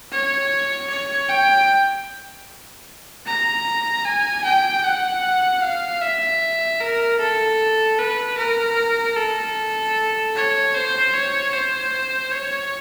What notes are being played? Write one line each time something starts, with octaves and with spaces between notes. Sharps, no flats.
C#5
C#5
G5
A#5
G#5
G5
F#5
F5
E5
A#4
A4
B4
A#4
A4
C#5
C5
C#5
C5
C#5